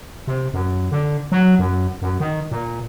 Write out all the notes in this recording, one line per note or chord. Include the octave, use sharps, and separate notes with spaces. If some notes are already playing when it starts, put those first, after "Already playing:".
C3
F#2
D3
F#3
F#2
F#2
D#3
A#2